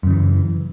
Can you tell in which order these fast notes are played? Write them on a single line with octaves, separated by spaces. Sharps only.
F#2 C#3 E3